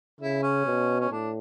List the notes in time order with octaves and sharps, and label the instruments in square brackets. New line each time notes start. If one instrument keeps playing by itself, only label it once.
[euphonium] C#3 [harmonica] E4
[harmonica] C#4
[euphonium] B2
[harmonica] C#4
[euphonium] A2 [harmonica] D4